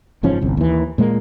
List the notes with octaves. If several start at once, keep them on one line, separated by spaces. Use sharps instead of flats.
F#1 G#2 F3 C#4
G1 C2
D#2 E3
A#2 G#3 A#3